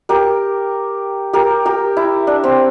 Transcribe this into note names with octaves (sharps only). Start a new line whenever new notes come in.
G4 A#4
G4 A#4
G4 A#4
E4
D4
C4